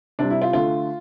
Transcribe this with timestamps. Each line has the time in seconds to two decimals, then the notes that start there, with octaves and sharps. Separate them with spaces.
0.19 C3 G3 D4
0.30 E4
0.42 F4
0.53 D3 A3 F4